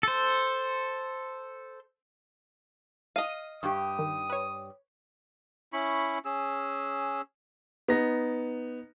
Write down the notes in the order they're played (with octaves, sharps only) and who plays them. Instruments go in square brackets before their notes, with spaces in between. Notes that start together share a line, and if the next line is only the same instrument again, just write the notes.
[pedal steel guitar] A4 C5
[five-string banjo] D#5 F5 [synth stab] D#7
[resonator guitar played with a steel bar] G2 G4 [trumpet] D#6
[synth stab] D#3
B4 C#5
[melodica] C#4 E4 B5 C#6
C#4 G#4 E6
[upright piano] B3 D#4 A#6